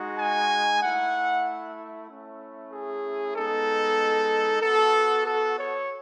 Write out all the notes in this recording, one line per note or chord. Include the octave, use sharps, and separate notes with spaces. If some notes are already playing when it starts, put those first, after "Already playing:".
Already playing: G#3 D#4 F#4
G#5
A3 E4 F#5
A3 C#4 E4
G#4
G#3 B3 D#4 A4
B3 F#4 A4
A4
C#5